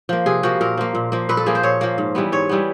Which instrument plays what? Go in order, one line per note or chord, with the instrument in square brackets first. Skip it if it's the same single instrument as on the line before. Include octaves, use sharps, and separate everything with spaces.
[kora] F3 A#3
C3 G#4
F3 A#3 F#4
A#2 A#4
F3 A#3
A#2
F3 A#3
A#2 B4
A4
F3 A#3 G#4
C5
A#2 C#5
F3 A#3
G#2
E3 G3 B3
G#2 C#5
E3 G3 B3